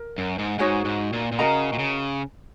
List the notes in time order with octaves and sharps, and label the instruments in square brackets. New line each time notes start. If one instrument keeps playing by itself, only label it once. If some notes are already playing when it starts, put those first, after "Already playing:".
Already playing: [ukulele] A#4
[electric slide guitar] F#2
G#2
[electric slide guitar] G#2 [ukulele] D#4 F#4 C#5 G#5
[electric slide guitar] G#2
A#2
A#2
[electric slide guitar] C#3 [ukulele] F#4 A#4 D#5 A#5
[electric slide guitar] A#2
C#3